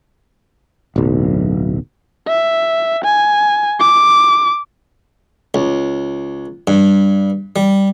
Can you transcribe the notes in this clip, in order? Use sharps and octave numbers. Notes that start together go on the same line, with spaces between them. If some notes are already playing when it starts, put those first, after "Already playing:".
D1 B1
E5
G#5
D6
C#2
G2
G3